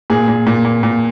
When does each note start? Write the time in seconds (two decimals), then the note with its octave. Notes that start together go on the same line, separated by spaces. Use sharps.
0.10 A#2 G#4
0.28 A#2
0.47 A#2
0.65 A#2
0.83 A#2